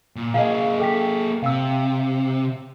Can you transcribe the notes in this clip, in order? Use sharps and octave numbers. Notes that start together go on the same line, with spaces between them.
A#2
A#3 G#4 D#5 F5
A4 G5 B6
C3 F5 E6